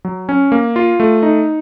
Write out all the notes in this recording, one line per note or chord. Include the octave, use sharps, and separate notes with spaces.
F#3
C#4
A#3
F4
A3
D#4